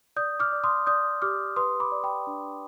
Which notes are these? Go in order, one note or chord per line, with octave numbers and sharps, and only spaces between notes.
D5 D#6 G6
D6 F6
D5
C6 D#6
D5 D#6 G6
G4 D6 F6
B4 C6 D#6
B5 D6
D5
G5 B5
D4